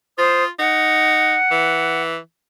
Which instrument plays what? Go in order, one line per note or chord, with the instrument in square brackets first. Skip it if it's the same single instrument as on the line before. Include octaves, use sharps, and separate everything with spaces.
[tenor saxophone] F4 [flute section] C5 D#6
[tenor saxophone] D#4 [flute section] F#5
[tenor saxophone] E3